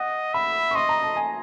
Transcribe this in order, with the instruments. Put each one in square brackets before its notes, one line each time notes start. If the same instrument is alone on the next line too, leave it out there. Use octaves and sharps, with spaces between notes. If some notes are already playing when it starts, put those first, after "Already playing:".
Already playing: [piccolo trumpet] D#5 [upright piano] F#5
[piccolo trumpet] E5 [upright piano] B5
[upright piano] C#6
[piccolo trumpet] D#5 [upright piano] C6
[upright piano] A#5
A5
G#5